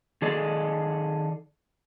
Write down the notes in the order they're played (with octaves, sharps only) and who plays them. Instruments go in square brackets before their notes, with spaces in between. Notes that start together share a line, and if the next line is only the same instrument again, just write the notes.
[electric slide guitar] D#3 G#4 A4 D5 D#5